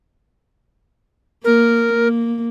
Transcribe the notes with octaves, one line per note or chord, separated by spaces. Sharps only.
A#3 A#4
A#3